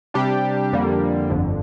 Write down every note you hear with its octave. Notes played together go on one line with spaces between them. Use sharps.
C3 G3 D4 G4
F2 D3 G3 A#3
G1 F2 D3